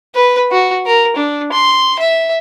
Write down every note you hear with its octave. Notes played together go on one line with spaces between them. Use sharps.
B4
F#4
A#4
D4
C6
E5